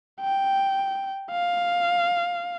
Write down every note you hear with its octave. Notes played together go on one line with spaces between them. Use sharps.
G5
F5